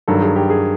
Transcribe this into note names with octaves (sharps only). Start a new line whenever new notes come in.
G2 D#3 F#3 A4
G#4
G4
G#4